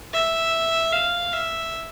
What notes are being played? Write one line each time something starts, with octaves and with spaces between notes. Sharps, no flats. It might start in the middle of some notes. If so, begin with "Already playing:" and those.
E5
F5
E5